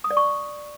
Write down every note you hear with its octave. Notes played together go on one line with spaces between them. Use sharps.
D#6
D5
C#6